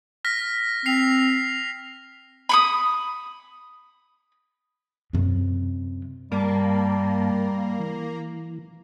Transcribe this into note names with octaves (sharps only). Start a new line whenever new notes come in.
F6 A#6 B6
C4 C7 F7
B5 C#6 D#6
F#2 C3
G2 G3 A#3 A5
E3